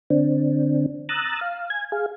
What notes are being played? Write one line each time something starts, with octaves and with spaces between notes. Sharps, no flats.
D3 C4 D4
A#5 D#6 E6 F#6 A6
F5
G#5 G#6
G#4 F5